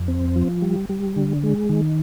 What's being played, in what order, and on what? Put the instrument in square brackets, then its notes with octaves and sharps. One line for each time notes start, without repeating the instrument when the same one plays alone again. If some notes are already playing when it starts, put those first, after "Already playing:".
Already playing: [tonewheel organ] F2
C4
F3
G3
G3
D3
G#3
D#3